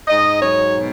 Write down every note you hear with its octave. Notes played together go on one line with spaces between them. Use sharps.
G#2 D#5
F#3 C#5
B2